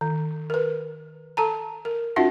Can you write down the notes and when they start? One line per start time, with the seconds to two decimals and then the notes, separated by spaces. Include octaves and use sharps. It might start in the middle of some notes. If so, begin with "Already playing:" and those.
0.01 D#3
0.50 A#4 B4
1.37 A4 A5 A#5
1.85 A#4
2.16 C#4 D#4 F4 F#4 E5 F#5